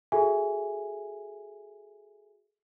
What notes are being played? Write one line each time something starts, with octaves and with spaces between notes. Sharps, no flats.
F#4 G#4 A4 E5 G#5